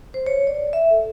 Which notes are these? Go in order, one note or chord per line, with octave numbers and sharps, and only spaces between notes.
C5
C#5
D5
E5
A4